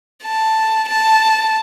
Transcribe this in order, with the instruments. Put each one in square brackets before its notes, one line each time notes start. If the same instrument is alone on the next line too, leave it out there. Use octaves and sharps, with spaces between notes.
[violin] A5
A5